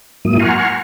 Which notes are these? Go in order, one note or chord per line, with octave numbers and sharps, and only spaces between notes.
G#2 F#3 A#3 E4 D#6
F#5 G#5 A#5 C6 C#6 F6